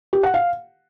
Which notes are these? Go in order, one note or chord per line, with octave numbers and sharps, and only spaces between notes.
G4
F#5
F5